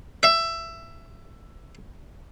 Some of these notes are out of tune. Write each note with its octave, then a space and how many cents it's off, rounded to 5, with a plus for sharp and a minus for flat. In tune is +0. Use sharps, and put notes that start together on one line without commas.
E5 +15